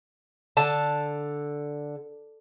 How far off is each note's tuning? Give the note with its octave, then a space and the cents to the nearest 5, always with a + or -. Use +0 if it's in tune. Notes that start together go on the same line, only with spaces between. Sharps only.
D3 +0 A5 +0